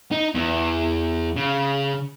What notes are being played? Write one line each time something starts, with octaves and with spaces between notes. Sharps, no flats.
D#4
E2
C#3